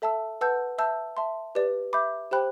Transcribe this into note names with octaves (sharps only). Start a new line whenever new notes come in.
A4 E5 A5 E6
B4 F#5 A5 E6 G6
E5 A5 E6 G6
E5 A5 C6
G4 B4 D5
E5 B5 D6 G6
G4 C5 G5 B5 F#6